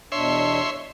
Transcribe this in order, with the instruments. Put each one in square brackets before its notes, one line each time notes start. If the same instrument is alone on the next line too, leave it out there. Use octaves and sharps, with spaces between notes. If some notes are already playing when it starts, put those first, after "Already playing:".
[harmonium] E2 B2 D4 [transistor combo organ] C#5 E5 C6